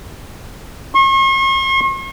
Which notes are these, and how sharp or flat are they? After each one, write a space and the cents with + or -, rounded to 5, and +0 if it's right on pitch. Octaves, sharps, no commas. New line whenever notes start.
C#6 -45